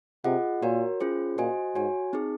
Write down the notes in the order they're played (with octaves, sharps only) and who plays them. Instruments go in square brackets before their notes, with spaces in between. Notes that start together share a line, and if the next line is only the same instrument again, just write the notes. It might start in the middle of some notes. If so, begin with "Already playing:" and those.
[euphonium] C3 [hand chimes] F4 G#4 D#5 F#5
[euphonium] A#2 [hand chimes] F#4 A#4 C#5
[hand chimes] C#4 F4 G#4 C5
[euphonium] A#2 [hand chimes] F#4 C5 D#5 G#5
[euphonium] G#2 [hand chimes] F#4 C#5 G#5
[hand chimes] C4 D#4 G#4